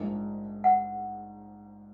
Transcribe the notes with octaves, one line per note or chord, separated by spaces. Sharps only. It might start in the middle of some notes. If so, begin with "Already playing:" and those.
Already playing: A#1 G#2 F3 A#3 D4
F#5